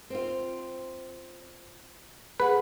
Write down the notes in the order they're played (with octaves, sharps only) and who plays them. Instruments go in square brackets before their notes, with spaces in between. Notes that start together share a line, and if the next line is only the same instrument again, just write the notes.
[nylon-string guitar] C4 F4
[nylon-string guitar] G#4 F#5 [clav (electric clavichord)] B4